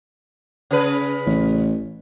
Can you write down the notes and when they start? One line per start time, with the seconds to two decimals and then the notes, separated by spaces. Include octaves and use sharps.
0.71 C#3 G#4 B4
1.26 A1